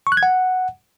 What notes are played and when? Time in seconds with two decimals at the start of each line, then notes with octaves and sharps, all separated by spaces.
0.07 C#6
0.12 F#6
0.17 G#6
0.23 F#5